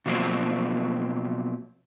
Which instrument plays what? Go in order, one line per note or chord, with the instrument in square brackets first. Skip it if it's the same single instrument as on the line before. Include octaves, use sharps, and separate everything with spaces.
[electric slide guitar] B2 F3 F#3 A#3 C4